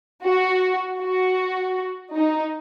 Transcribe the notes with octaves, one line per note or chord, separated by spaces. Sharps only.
F#4
F#4
D#4